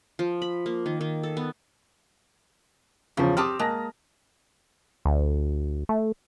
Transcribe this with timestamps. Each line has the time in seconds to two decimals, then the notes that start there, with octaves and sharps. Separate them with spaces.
0.19 F3
0.42 B5
0.66 A#3
0.86 D#3
1.01 D#3
1.23 A4
1.37 B3
3.17 E2 C#3 F3 C#4
3.37 C4 G4 A5 D6 D#6 F6
3.59 G#3 A#3 A5 A#6
5.05 D2
5.89 A3